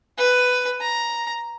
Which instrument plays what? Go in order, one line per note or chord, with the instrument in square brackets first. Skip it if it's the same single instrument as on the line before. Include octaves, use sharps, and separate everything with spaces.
[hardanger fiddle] B4
A#5